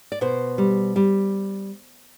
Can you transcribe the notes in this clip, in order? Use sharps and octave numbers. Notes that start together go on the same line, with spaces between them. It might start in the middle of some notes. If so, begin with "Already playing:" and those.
D5
B2 C5
G3
G3